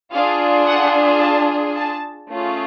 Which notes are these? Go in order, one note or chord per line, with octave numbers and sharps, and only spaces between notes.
D4 F4 G#4 F5
F#5
A5
A5
A3 C#4 F4 G#4